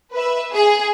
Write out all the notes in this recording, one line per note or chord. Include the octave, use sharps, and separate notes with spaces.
B4 E5
G#4